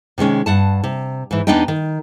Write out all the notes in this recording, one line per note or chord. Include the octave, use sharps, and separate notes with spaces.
C3 D#3 G#3 C#4
G2 F#5 A5
C3
G#2 E3
E2 B3 D4 D#4 D#5 G5
D#3